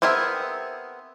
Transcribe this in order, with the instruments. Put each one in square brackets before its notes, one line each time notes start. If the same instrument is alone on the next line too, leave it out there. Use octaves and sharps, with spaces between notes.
[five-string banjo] B3 C4 G#4 A#4 E5